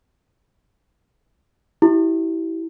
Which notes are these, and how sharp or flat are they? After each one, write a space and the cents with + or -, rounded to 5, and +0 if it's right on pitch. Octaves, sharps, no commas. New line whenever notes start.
E4 -15 G4 -35